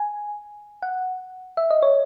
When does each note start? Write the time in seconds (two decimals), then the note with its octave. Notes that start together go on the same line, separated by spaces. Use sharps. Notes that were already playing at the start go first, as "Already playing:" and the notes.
Already playing: G#5
0.82 F#5
1.57 E5
1.70 D#5
1.82 C#5